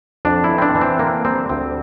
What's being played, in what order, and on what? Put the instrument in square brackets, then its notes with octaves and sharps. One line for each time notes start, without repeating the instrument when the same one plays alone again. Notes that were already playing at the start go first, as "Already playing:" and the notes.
[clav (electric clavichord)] F2 D4
E4
E3
C4
D4
E3
C4
D3 A#3
G3 C4
D2 C4